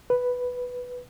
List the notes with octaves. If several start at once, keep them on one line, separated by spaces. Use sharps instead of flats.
B4